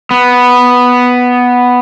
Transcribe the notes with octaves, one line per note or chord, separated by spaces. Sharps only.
B3